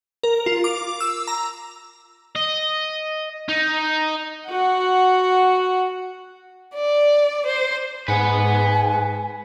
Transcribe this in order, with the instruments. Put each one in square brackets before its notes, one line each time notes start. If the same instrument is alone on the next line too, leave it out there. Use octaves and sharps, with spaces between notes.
[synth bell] A#4
F4
D6
E6
A#5
[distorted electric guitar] D#5
D#4
[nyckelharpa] F#4 F#5
[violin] D5
C5
[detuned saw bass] G#2 [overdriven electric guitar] B4 F#5 [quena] G#5